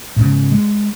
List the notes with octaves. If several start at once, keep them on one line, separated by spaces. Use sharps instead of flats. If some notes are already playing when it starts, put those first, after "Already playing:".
G#2 C#3
G#3